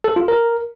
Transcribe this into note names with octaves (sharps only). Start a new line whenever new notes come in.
A4
F4
A#4